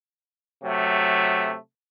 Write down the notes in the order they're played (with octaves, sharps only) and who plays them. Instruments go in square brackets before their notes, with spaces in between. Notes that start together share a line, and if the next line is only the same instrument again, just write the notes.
[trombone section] C3 F#3 A3